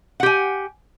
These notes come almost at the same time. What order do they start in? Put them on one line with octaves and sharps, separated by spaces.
F#5 G4 G#5